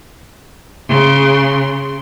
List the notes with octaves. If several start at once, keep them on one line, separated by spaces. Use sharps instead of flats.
C#3 C6